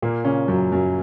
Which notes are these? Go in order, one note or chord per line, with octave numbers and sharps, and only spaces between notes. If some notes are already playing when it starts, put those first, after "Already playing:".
A#2 A#3
C#3 C#4
F#2 F#3
F#2 F#3